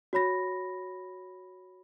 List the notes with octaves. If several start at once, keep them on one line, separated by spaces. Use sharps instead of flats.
F#4 C#5 B5 A#6